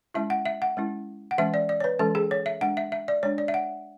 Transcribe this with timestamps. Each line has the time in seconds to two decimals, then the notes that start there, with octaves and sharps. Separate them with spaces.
0.14 G#3 C#4 E4 E5
0.30 F#5
0.46 E5
0.62 F#5
0.77 G#3 C#4 E4
1.31 F#5
1.38 E3 G#3 C#4 E5
1.54 D5
1.69 D5
1.80 C#5
1.84 B4
1.99 E3 G#3 C#4 A4
2.15 G#4
2.31 C#5
2.46 E5
2.61 G#3 D4 F#5
2.77 E5
2.92 E5
3.08 D5
3.23 G#3 D4 C#5
3.38 D5
3.48 E5
3.54 F#5